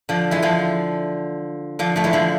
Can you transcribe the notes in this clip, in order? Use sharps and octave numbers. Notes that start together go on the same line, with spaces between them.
D3 F3
E3 G#3
D3 F3
D3 F3
F3 A3
E3 G#3
D3 F3